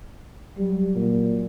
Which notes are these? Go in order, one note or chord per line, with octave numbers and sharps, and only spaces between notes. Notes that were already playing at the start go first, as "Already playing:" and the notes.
F#3 G3
A#2